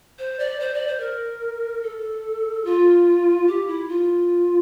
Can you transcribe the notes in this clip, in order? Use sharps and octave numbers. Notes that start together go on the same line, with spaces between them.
C5
D5
C5
D5
C5
A#4
A4
F4
G4
E4
F4